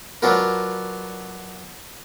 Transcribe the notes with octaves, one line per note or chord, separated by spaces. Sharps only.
F#3 D4 F4 A#4 B4